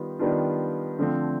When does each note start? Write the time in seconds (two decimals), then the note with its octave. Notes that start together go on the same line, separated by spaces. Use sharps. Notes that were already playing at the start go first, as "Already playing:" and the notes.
Already playing: D#3 G3 B3 F4
0.19 D#3 G3 B3 D4 F4
0.98 D3 F3 A3 C4